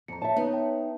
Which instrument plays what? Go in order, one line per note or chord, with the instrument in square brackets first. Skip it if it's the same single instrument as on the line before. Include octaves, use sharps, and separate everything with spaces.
[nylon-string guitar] F2 [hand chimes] A#5 C#7
[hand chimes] C#5 [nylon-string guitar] E5 A5
[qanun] B3 [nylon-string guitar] D#4 [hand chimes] C#5
[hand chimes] E5 G5 A5